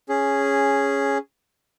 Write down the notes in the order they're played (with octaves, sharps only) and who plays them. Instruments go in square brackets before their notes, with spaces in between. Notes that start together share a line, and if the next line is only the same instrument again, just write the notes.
[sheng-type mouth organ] C#4 G#4